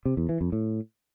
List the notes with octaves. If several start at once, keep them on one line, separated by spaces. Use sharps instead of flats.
C3
E2
E3
F2
A2